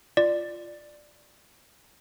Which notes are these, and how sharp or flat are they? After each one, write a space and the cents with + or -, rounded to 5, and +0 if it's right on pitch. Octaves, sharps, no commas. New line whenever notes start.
F4 -10 D5 +10